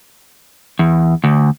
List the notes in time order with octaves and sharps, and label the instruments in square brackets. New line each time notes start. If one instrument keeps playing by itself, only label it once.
[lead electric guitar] E2
D2